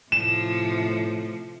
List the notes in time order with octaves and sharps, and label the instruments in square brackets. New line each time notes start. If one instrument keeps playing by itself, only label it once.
[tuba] A2 [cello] C3 F3 [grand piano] E7